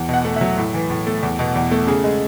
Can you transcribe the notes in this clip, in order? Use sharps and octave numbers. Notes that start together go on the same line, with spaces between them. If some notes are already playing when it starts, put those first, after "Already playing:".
Already playing: E2
B2
F#5
A3
F#3 E5
A2
E3
A2
A3
E2
B2
E2
A3
C#3 G#4
G#3